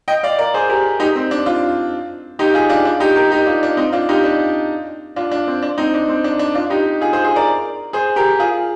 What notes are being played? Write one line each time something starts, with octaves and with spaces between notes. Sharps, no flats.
D#5 G5
D5 F5
A#4 D5
G#4 C5
G4 A#4
D#4 G4
C4
D4
D4 F4
D#4 G4
F4 G#4
D4 F4
D4 F4
D#4 G4
G4 A#4
D#4 G4
D4 F4
D4
C4 D#4
D4 F4
D#4 G4
D4 F4
D4 F4
D4
C4
D4
C4 D#4
D4
C4
D4
D4
D4 F4
D#4 G4
F4 G#4
G#4 C5
G#4 C5
A#4 D5
G#4 C5
G4 A#4
F4 G#4